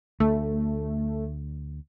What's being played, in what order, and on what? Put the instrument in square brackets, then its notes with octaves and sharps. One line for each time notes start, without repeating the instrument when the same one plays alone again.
[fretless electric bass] D2 [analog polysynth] A3